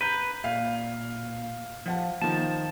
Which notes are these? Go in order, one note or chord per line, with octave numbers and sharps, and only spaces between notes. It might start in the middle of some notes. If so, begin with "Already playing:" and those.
B4 A#5 G6
A#2 F5
F3 F4 F#5 A5
D#3 F3 A5